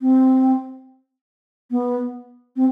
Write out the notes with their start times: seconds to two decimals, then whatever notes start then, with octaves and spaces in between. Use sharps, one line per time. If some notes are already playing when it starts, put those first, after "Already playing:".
0.01 C4
1.71 B3
2.56 C4